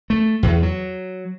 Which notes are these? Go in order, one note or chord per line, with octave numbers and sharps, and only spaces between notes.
A3
E2
F#3